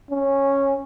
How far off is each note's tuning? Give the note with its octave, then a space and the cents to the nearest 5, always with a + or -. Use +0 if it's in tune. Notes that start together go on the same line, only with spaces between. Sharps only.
C#4 -10